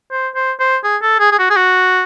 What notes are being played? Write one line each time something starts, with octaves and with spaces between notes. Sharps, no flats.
C5
C5
C5
G#4
A4
G#4
G#4
F#4
G#4
F#4